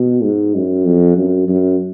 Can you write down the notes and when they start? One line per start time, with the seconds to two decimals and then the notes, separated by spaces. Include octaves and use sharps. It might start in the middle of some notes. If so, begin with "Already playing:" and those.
Already playing: B2
0.23 G#2
0.55 F#2
0.85 F2
1.17 F#2
1.48 F#2